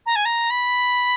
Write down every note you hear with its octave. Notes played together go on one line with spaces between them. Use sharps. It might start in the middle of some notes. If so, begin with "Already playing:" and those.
A#5
G#5
A#5
B5